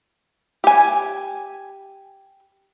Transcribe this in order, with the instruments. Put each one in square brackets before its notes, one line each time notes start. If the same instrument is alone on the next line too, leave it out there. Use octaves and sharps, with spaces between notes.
[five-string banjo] G4 G#5